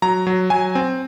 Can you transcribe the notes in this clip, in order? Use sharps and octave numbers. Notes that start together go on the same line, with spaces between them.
F#3 A#5
F#3
F#3 G#5
C4